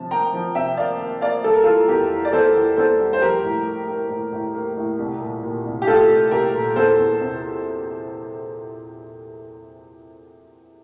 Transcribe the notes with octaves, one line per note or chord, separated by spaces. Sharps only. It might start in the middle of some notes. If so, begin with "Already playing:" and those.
Already playing: C3 F3 A5
A#3 G5 A#5
F3
C3 E5 G5
A#3 D5 F5
A#3
A#3 D5 F5
G3 A4
A#4
E3 F4 A4
E2 G4 A#4
E3
D5
E2 A4 C5
E3
E2 A4 C5
G3
C5
F3 G4 A#4
A2
A#3
A#3
A2
A2
A#3
A2
C2
A#2
A#2
C2
G4
A3 F4 A4
C2
C2 G4 A#4
A#2
E2 A4 C5
E2
C3